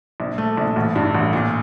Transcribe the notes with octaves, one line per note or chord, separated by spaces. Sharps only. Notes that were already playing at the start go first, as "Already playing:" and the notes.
A#1
A3
A#1
A1
G2
A1
A#2